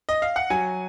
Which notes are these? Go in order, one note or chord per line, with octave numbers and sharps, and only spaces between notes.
D#5
F5
F#5
F#3 G#5